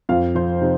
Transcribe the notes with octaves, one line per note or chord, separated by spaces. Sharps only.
F2 F4 F5
F3 C4 C5
C3 D#4